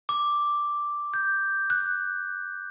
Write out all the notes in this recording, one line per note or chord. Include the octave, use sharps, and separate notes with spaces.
D6
G6
F#6